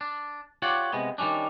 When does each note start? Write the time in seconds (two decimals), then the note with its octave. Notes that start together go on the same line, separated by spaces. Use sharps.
0.01 D4
0.62 F4 G4 C#5 D5 F#5
0.93 C3 G#3 B3
1.18 D#3 G3 G#3 C#4 D4